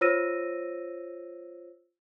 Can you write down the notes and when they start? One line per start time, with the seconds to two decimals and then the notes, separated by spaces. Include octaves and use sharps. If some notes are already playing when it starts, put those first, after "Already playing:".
0.01 F4 C5 C#5 E6 A#6 D#7